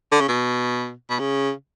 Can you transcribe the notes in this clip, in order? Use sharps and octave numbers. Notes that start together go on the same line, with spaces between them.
D3
C#3
B2
B2
C#3